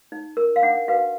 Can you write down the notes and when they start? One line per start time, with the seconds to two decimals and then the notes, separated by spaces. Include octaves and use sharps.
0.12 D#4
0.37 A#4
0.56 F5
0.63 D4 F#5
0.88 F#4 B4 F5